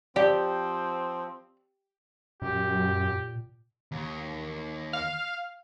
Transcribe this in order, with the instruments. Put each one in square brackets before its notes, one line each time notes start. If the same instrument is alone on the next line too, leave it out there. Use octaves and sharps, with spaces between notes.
[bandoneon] F3 [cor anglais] C4 [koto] G4 [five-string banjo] D5
[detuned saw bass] F#2 [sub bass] A#2 [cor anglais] G4
[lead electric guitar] D#2
[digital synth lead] F5